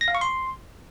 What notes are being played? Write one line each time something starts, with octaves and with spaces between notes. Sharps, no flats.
A#6
F5
C#6
C6